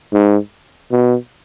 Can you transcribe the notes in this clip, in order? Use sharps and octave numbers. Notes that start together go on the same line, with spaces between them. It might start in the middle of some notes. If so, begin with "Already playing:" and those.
G#2
B2